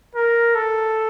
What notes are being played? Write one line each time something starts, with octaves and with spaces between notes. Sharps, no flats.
A#4
A4